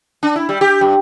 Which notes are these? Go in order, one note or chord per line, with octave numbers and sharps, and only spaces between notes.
D4
E4
G3
G4
G2